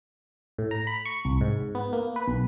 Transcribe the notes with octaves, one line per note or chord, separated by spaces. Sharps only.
A2
A#5
B5
C#6
C2
G#2
B3
A#3
B4
B1